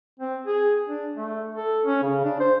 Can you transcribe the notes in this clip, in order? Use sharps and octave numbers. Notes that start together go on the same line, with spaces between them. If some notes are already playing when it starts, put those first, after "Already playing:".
C4
G#4
D4
A3
A4
C#4
C#3
D4
C5